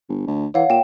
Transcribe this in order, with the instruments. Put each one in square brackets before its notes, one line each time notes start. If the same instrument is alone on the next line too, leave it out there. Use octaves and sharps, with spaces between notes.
[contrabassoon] G1
D2
[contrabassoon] E3 [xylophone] C#5 F5 F#5
[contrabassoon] A#2 [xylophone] G5 E7